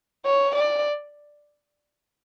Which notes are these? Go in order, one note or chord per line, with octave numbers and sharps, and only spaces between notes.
C#5
D5